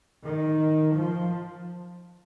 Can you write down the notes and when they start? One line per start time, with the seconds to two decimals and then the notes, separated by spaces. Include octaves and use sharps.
0.23 D#3
0.96 F3